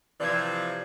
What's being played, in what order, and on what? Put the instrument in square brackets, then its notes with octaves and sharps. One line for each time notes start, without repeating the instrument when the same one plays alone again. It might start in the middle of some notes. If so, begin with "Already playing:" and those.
[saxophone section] C3 E3 F3 [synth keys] D5 G#6